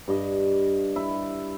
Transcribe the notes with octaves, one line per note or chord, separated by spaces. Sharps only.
G2 D#5
E4